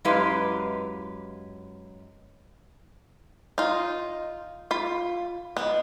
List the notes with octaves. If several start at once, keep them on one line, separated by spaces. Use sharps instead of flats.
F#2 G#3 E4 G4 B4 F5
D#4 F4
F4 B5
G#3 B3 D#4 E4